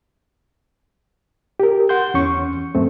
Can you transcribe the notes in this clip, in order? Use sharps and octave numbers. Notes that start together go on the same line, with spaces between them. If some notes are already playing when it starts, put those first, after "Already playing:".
G4 A#4
F#5 C6 G6
E2 C#4 C#6
F#2 A3 C4